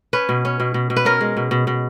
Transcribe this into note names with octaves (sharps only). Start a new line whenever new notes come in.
C#4 B4
B2
C#4
B2
B2
B2
B4
C#4 A#4
G#3
B2
B2
B2